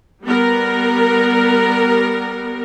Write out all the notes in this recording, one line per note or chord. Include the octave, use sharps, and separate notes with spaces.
G3 B3 A#4